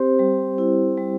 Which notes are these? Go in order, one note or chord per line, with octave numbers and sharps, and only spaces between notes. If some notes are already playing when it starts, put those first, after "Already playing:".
Already playing: C4 G4 C5
G3
E4
G3